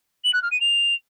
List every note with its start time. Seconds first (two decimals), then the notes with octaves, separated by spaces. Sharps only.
0.24 F#7
0.33 F#6
0.42 F6
0.51 D#7
0.60 F7